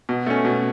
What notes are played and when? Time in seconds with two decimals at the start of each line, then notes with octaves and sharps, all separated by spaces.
0.09 B2
0.26 A3 C#4
0.45 B2